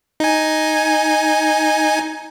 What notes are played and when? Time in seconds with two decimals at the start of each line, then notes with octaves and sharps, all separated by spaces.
0.20 D#4 G#5